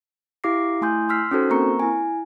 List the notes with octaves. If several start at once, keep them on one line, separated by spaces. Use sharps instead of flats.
E4 G4 F5 D6 A#6 C7
A3 E4 G#5 C6 D#6 G6
C6 E6 F6 B6 C7
C#4 D#4 F#4 A4 C5
A#3 C4 A#4 A#5 C#6 C#7
E4 G#5